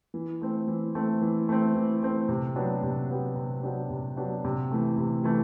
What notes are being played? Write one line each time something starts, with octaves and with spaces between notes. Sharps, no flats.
E3
A3 C4
E3
A3 C4
E3
A3 C4
E3
A3 C4
C3
F#3 B3 D4 G4
C3
F#3 B3 D4 G4
C3
F#3 B3 D4 G4
C3
F#3 B3 D4 G4
C3
E3 A3
C3
E3 A3